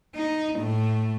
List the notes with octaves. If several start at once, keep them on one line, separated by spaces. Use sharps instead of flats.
D#4
A2 A3